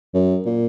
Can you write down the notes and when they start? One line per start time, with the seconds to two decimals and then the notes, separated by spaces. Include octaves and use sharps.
0.14 F#2
0.45 A#2